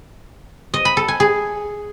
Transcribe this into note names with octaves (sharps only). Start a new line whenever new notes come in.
D#5
B5
A4
G#5
G#4